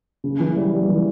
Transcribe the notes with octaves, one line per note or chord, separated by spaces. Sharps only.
C#3
E3
G3
G3
E3